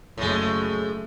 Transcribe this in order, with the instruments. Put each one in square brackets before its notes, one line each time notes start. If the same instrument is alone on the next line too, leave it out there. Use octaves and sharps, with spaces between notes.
[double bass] F#1 A3 [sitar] A2 G#3